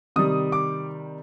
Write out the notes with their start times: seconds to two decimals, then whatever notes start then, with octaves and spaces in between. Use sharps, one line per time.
0.16 C3 D#3 G3 D#6
0.52 D6